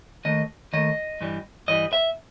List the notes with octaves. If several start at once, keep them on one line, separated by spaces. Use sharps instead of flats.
D#2 D#3 A3 D#5
D#2 D#3 A3 D#5
G2 E3 G3
G2 E3 G3 D#5
E5